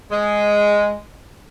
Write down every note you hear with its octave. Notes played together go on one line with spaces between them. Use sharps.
G#3